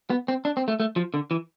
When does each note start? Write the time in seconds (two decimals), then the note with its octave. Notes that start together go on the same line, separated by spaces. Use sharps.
0.10 B3
0.28 C4
0.45 D4
0.57 C4
0.68 A3
0.80 A3
0.96 F3
1.14 D3
1.31 E3